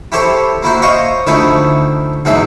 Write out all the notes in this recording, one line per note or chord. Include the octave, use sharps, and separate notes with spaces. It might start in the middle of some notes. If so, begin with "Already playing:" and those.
E4 G4 A4 C5 C#5
A#3 E4 F#4 C5
C5 C#5 D#5 F5 G5 C#6
D2 D#3 F3 A3 E4 C#5
E2 G#2 B2 E3 F#3 E5